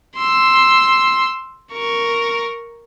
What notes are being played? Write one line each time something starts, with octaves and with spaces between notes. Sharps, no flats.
C6 E6
A#4 C#6